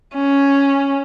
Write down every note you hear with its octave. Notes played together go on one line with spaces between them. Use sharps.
C#4